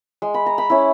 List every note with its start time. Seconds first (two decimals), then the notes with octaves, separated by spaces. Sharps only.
0.22 G#3
0.34 B5
0.46 A#5
0.58 B5
0.70 C#4 E4